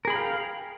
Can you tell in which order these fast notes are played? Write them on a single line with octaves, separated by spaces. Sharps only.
A#4 G#4 B5 G5 F5